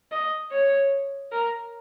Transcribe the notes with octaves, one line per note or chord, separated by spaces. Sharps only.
D#5
C#5
A#4